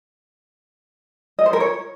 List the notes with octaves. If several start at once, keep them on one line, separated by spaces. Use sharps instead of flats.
D#5
C5
A#4
C#5